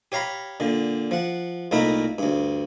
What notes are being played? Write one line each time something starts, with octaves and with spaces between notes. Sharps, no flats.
G4 C#5 F5 A#5 B5
A#2 D3
F3 F#5
C2 A#2 A3 D#4 A#4 B5
D2 G2